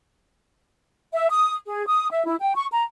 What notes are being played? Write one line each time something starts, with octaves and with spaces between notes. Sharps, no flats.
E5
D#6
G#4
D#6
E5
E4
G5
C#6
A#5